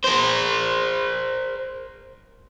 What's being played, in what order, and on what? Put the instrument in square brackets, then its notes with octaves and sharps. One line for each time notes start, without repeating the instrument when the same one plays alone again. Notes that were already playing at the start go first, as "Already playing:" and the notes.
[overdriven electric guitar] A#4 C5